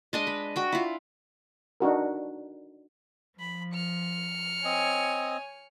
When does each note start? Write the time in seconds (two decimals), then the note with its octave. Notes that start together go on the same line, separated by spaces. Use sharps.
0.13 G#3 D4 D#5
0.27 B4
0.56 F#4 G5
0.72 E4 F4
1.80 D4 D#4 F#4 A#4
3.40 F3 B5
3.74 F6 C#7
4.65 C4 C#5 D#5 G#5